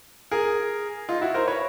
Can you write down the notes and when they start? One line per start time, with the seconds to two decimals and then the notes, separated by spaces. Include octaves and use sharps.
0.31 G#4 A#4
1.09 D#4 F4
1.22 E4 F#4
1.34 A#4 C5
1.47 B4 C#5